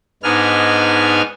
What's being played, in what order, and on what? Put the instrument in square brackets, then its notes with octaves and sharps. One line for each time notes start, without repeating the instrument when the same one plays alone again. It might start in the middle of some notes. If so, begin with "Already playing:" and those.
[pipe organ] G#2 B3 D4 D#4 G#5 F6